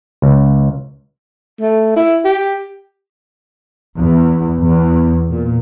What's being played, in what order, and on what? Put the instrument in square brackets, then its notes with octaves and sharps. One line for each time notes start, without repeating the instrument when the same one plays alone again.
[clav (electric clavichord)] C#2
[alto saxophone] A3
E4
G4
[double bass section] E2
E2
A#2